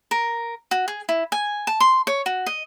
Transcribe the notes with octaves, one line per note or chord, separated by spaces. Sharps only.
A#4
F#4
G#4
E4
G#5
A5
C6
C#5
F#4
D#5